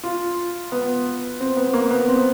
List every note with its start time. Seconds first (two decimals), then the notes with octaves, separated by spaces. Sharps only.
0.03 F4
0.72 B3
1.40 C4
1.57 B3
1.73 A#3
1.91 B3
2.08 C4